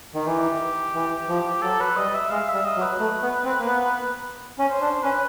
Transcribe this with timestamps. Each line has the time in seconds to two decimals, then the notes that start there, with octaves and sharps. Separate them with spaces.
0.15 D#3
0.26 E3 G4
0.94 E3
1.28 F3
1.62 F#3 A4
1.80 B4
1.97 G3 D#5
2.14 E5
2.30 G#3 F5
2.49 G3 E5
2.65 D#5
2.76 F#3
2.82 B4
2.99 A3
3.22 B3
3.44 C4
3.59 A#3
3.67 B3
4.59 C#4
4.70 C5
4.81 D4
5.04 C#4 B4